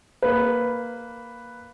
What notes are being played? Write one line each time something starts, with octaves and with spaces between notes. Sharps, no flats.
A#3 B4